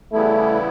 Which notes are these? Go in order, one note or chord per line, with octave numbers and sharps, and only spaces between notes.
C#3 E3 G3 A3 B3 E4